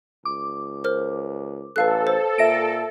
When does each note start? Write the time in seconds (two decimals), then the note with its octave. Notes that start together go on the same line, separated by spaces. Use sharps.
0.25 C#2 D6
0.84 A#4 C5 F6
1.76 A1 A4 B4 F5 F#6
2.07 C5
2.38 A#2 E5 A#6 D7